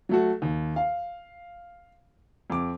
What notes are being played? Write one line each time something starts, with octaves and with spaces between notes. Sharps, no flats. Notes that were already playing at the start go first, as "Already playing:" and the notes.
F#3 A3 F#4
D#2
F5
F2 D6